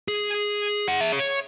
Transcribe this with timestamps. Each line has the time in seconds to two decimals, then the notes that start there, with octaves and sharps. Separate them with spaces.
0.08 G#4
0.88 F#5
1.01 E5
1.12 C#5